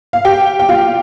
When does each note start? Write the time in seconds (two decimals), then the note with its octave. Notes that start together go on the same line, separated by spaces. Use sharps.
0.13 F5
0.25 G4 G5
0.60 G5
0.69 F4 F5